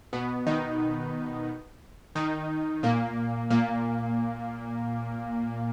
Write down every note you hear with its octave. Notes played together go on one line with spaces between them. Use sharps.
B2 B3
D#3 D#4
D#3 D#4
A#2 A#3
A#2 A#3